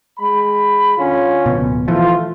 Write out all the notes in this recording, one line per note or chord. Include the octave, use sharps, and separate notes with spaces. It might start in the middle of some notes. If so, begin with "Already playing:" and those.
G#3 B5
D3 C#4 F4
D1 B2
E3 F3 A3 F4